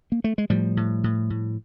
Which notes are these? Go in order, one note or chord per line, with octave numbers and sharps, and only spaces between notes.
A#3
A3
G#3
A2 F3 G3
A2
A2
A2